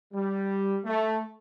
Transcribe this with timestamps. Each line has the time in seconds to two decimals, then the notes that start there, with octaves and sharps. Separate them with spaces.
0.14 G3
0.85 A3